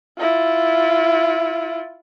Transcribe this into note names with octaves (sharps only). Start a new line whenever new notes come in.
E4 F4